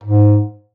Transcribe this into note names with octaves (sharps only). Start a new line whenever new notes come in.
G#2